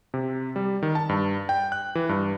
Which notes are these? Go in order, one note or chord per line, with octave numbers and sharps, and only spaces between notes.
C3
G3
D#3
A5
G2
G5
F#6
E3
G2